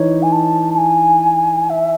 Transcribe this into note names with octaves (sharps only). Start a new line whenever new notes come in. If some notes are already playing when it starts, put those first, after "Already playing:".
Already playing: E3 D#4 C#5
G#5
A5
A5
G#5
E5